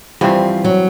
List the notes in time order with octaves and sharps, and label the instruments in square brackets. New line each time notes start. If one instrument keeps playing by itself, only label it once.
[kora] G2 E3 G3 C4 [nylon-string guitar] F3
[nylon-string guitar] F#3